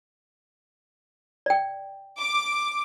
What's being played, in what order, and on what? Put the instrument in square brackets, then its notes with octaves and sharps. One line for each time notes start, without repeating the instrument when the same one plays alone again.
[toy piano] D5 G5
[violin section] D6